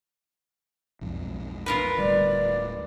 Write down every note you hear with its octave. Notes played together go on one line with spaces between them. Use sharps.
B1 F2 G#2
F4 A#4 B4
D1 D2 G3 D5